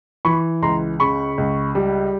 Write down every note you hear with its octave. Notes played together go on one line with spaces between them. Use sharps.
E3 B5 C#6
C#2 A#5 C6
C#3 B5 C#6
C#2
G3